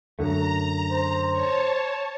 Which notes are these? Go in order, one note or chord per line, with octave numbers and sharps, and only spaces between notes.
F#2 D3 A3 A#5
C5
C#5 A5